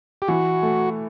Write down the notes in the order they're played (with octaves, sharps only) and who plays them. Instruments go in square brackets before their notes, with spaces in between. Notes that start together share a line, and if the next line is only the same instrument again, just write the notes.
[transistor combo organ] G4
[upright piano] E3 [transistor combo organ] F#4
[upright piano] A3